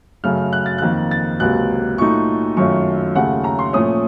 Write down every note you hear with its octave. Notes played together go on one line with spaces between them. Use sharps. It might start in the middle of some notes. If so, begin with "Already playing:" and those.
F#2 C#3 F#3 A3 F6
F#6
A6
F2 D#3 A#3 F#6
A6
C#2 C3 F#3 A#3 F#6
A#2 F#3 A3 D#4 C#6
F#2 D#3 A3 C#4 F4 C#6
D#2 C#3 A3 C#4 F4 F#5
A#5
C6
A#2 F3 A3 C#4 D#6